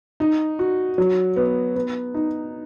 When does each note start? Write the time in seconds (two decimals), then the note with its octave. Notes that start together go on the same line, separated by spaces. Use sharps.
0.20 D#4
0.59 F#4
0.98 F#3
1.36 B3
1.76 B3
2.14 D#4